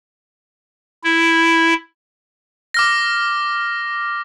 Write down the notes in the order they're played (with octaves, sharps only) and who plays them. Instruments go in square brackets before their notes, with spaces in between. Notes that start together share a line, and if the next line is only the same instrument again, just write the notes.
[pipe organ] E4
[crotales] D6 F6 A#6